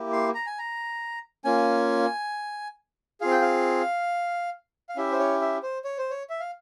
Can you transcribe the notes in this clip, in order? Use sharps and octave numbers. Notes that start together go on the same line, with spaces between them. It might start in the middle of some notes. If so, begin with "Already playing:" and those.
Already playing: A#3 E4 G4
C6
A#5
G#5
A#5
A#3 C#4 F4 G#5
C4 F4 G#4 F5
G5
F5
F5
C#4 E4 G4 E5
C5
C#5
E5
C5
C#5
C5
C#5
E5
F5